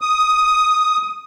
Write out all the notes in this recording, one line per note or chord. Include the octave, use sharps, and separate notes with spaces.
D#6